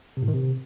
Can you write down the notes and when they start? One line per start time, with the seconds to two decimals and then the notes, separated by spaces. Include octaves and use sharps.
0.17 C3
0.23 A2
0.28 D#3
0.34 C3